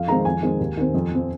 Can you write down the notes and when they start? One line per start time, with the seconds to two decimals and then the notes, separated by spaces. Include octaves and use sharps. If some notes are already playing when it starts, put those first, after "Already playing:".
Already playing: F2 F5
0.08 D#3 G#3 C4 A#5
0.25 F2 G#5
0.42 D#3 G#3 C4
0.60 D#2
0.77 D#3 C4
0.94 F2
1.11 F3 C4